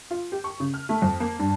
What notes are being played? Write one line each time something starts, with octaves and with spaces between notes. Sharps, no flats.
F4
G4
C#6
C#3
F6
A3
F2
A#3
G2